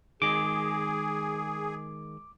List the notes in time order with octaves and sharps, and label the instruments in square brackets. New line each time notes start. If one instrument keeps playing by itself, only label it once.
[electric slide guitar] D#3 G#3 [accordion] G#4 [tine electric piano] D6